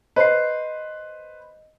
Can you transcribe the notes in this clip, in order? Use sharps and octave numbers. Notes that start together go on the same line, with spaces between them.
B4 C5 D#5 C7